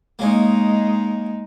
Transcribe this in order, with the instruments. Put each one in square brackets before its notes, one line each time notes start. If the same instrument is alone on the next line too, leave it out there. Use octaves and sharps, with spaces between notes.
[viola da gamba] G#3 D#4 [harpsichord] A#3 C#4